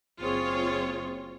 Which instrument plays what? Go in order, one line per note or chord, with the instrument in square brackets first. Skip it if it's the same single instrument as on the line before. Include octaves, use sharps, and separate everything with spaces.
[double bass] F#1 C4 [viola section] F4 G#4 C#5